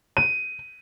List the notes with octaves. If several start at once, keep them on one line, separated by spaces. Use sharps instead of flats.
D#7